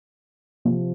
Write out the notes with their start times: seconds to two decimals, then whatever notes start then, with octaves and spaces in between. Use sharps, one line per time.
0.65 C3 F3 C4